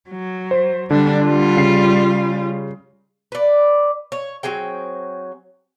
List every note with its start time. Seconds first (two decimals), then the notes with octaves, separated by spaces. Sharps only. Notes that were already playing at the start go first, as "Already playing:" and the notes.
0.10 F#3
0.51 C5
0.90 D3 G3 D4
1.25 G3 F4
1.57 C#3 C7
3.32 B4 D5
4.12 C#5
4.43 F#3 C4 G#4 G5